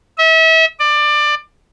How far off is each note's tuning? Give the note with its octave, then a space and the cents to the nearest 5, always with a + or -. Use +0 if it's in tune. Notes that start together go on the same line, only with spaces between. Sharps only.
E5 -35
D5 +20